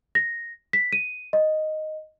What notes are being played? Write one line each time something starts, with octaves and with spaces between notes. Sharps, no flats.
A#6
B6
D#7
D#5